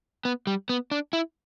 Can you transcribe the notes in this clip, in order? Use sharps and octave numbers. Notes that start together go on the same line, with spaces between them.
B3
G3
B3
D4
E4